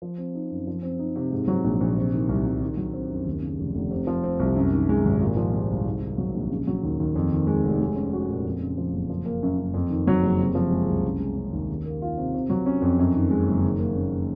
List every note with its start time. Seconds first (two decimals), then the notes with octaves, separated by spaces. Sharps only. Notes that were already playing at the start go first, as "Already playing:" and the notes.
0.02 F3
0.18 C4
0.34 D#4
0.50 F#2
0.67 F3
0.83 C4
0.99 D#4
1.16 C3
1.31 G#2
1.48 F#3
1.65 A#1
1.81 A#1
1.96 C3
2.13 D#3
2.29 C2
2.46 C2
2.61 D#3
2.77 F#3
2.93 C4
3.10 F#2
3.26 D#2
3.42 C#3
3.58 F1
3.75 F1
3.91 C3
4.07 F3
4.24 C4
4.40 C2
4.56 F#2
4.73 D#3
4.89 G#3
5.05 G#1
5.21 A#2
5.36 F3
5.53 G#3
5.70 C2
5.86 G#2
6.02 D#3
6.18 F#3
6.34 A#1
6.51 C#3
6.67 F#3
6.83 D#2
7.00 D#2
7.15 F2
7.31 D#3
7.47 G#3
7.64 F1
7.81 G#3
7.96 C#4
8.13 F#4
8.29 A#2
8.45 F2
8.61 C#3
8.78 F3
8.93 F#1
9.10 F3
9.26 A#3
9.43 F#2
9.58 F#2
9.74 F2
9.90 D#3
10.07 F#3
10.22 F#1
10.39 C3
10.55 F3
10.71 G#3
10.88 C2
11.04 C#3
11.20 G#3
11.36 C#4
11.53 D#2
11.70 D#3
11.86 A#3
12.02 F4
12.17 C3
12.34 C3
12.50 F#3
12.66 C#4
12.82 F2
12.99 F#2
13.15 D#3
13.30 G#3
13.47 F#1
13.64 D#3
13.79 A#3
13.96 C#4